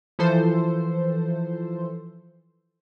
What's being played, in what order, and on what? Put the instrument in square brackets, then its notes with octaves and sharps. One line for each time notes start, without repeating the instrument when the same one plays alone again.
[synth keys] E3 F3 A4 C5